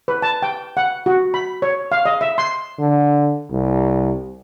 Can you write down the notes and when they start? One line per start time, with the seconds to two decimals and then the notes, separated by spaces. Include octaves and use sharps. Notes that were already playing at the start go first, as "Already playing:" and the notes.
0.08 B4
0.22 A5
0.43 G5
0.77 F#5
1.06 F#4
1.34 B5
1.62 C#5
1.92 F5
2.05 D#5
2.21 E5
2.38 C6
2.79 D3
3.51 C2